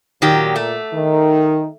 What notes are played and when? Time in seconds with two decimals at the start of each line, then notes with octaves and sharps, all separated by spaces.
0.22 A#2 D#3 F#3 G4
0.56 A3
0.93 D#3